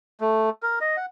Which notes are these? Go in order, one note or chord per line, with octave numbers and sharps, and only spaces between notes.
A3
A#4
D#5
F#5